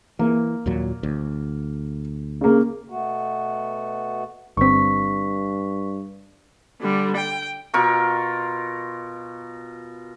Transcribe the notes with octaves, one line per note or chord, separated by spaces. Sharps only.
E3 A#3
D#2 A#2 F#3
D2
C#3 A#3
B2 A3 B3 F#4
G1 G2 C4 C#6 B6
D3 G3
G5
B2 F4 A#4 C#6